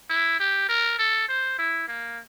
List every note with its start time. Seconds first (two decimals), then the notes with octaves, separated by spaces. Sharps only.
0.09 E4
0.39 G4
0.69 A#4
0.98 A4
1.28 C5
1.58 E4
1.88 A#3